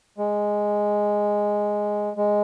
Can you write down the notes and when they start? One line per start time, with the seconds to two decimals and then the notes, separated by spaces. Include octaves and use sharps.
0.18 G#3
2.17 G#3